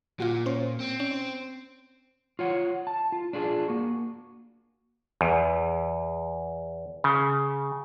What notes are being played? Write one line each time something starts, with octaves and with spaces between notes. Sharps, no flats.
A#2 F4 F#4
C#4 C5 C#5
C4
C#4
F4 C#5 F#5
A5
F4
D4 F4 G#4
A#3 F#4
E2
C#3